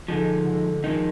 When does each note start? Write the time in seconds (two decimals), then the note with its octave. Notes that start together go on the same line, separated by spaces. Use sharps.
0.08 D3 F3 G#3 D#4
0.46 D3
0.83 D#3 F3 G#3 D#4